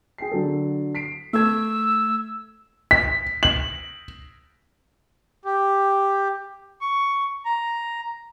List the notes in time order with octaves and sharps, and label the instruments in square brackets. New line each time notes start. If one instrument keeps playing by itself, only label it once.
[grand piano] G#4 G5 C7
D3 F#3 A4
B6 C7 D7
[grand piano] A3 A4 G#6 [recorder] E6
[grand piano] B6
F#7
[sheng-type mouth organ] G4
C#6
A#5